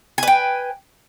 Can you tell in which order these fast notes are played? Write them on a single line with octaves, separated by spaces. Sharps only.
G#5 B4 G5